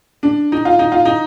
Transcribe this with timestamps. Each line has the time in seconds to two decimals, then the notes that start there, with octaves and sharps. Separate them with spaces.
0.23 D4
0.52 D#4
0.65 F4
0.79 D#4
0.92 F4
1.05 D#4